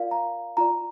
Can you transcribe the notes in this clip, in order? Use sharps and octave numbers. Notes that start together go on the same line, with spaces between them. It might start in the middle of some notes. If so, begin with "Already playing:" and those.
Already playing: F4 A#4 D5 F5
A#5
F4 D5 A#5